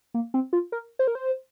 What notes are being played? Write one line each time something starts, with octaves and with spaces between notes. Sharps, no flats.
A#3
C4
F4
A#4
C5
A#4
C5